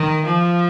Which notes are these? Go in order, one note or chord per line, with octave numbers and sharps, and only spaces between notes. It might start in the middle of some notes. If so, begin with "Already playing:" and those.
Already playing: D#3
F3